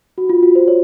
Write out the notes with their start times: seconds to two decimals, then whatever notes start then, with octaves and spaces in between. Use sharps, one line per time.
0.18 F#4
0.29 F4
0.43 F#4
0.55 C5
0.68 C#5